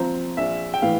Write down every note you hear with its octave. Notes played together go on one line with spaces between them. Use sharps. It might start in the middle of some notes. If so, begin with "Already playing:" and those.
Already playing: F3 C4 A#5
A#1 E5
G5
A2 E3 F5